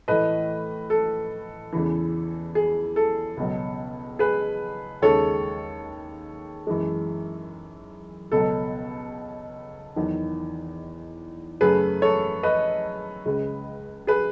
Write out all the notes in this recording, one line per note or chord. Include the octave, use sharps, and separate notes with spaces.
A2 E3 A3 B4 D#5
A4
E2 C#3 E3
G#4
A4
C#2 B2 F#3
G#4 B4
D#2 C#3 G#3 A4 C#5
F#2 E3 G#3
C#2 B2 F#3 A4
E2 D#3 F#3
F#2 C#3 F#3 A3 G#4 B4
A4 C#5
B4 D#5
C#2 C#3 G#3
G#4 B4